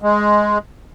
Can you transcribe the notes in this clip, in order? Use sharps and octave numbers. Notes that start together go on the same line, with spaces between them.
G#3